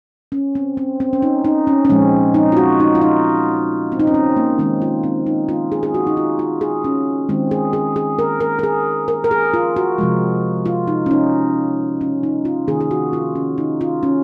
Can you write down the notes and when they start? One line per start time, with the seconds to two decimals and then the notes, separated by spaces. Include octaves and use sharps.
0.32 C#4
0.55 C4
0.77 C4
1.00 C4
1.13 C#4
1.22 D#4
1.45 D#4
1.67 C#4
1.85 C#4
1.90 A#2 F3 G#3 C4
2.34 D#4
2.52 F4
2.57 F#4
2.80 D#4
2.95 F4
3.01 D#4
3.92 C4
4.00 D#4
4.07 C#4
4.14 C4
4.36 A#3
4.59 D#3 G#3 C4
4.82 F4
5.04 C4
5.26 D#4
5.49 F4
5.72 G#4
5.83 G#4
5.94 F#4
6.07 D#4
6.17 F4
6.39 F4
6.61 G#4
6.84 C#4
7.29 D#3 G#3 C4
7.51 G#4
7.73 G#4
7.96 G#4
8.19 A#4
8.40 A#4
8.59 A#4
8.63 G#4
9.08 A#4
9.24 A#4
9.31 G#4
9.54 F4
9.76 F#4
9.98 C3 F3 G#3
10.66 F4
10.88 D#4
11.06 C#4
11.11 D#4
12.01 C#4
12.23 D#4
12.45 F4
12.67 C3 D#3 A#3 G#4
12.81 G#4
12.91 F#4
13.13 F4
13.35 C#4
13.58 D#4
13.81 F4
14.03 C#4